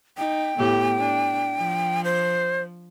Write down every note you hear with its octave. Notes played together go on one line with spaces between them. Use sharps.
D#4 G5
A2 B3 G4
D4
F3
C5